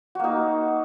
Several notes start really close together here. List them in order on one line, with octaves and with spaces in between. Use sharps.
F#4 A#3 D#4